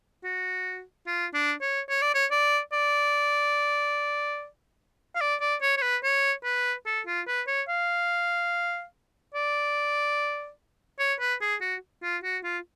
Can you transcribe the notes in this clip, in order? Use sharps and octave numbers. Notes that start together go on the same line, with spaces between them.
F#4
F4
D4
C#5
C#5
D5
C#5
D5
D5
F5
D5
D5
C#5
C#5
B4
C#5
B4
A4
F4
B4
C#5
F5
D5
C#5
B4
G#4
F#4
F4
F#4
F4